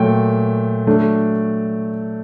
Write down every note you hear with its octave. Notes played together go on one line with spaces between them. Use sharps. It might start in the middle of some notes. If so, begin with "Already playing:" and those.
Already playing: A#2 F#3 A3 G5
F#3 A3 D4